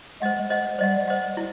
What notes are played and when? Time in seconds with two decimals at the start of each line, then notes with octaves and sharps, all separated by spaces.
0.22 G#3 C5 D#5 F#5
0.50 C5 D#5 F#5
0.79 G3 C5 D#5 F#5
1.08 C5 D#5 F#5
1.37 E4